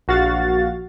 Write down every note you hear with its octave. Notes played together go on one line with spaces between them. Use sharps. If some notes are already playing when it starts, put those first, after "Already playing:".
A#1 F#4 F5 A6